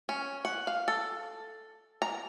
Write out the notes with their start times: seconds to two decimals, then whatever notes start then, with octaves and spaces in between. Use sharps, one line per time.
0.09 C#4
0.45 F#5
0.67 F5
0.88 A4
2.02 A#5